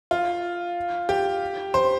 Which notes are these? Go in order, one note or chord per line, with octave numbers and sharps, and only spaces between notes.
F4
G4
C5